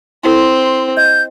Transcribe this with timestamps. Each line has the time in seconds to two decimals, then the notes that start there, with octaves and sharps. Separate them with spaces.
0.24 C4 E4 A4 C6
0.97 D#5 G6